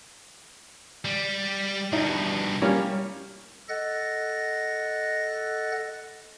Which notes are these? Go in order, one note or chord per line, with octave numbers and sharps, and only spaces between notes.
G3
G2 B2 D#4
G3 A#3 C#4
A4 D#5 F#5 F#6 A6 A#6